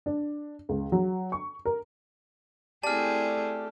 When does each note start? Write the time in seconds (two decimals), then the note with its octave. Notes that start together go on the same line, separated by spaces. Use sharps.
0.06 D4
0.69 C#2
0.92 F#3
1.32 C#6
1.65 A#4
2.83 A3 C4 E4 G4 G#4 D5 A5 F6